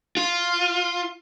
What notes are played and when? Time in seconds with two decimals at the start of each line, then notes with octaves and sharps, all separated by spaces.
0.17 F4